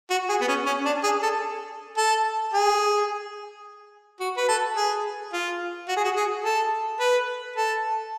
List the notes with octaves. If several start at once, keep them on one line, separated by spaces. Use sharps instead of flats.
F#4
G#4
B3
C#4
C#4
D4
G#4
A4
A4
G#4
F#4
B4
A4
G#4
F4
F#4
G#4
F#4
G#4
A4
B4
A4